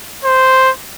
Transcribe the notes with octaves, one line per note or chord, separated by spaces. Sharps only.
C5